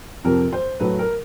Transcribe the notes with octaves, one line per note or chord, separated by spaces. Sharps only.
F2 C3 F3 A#4
C5
A2 F#3 A3 B4
A#4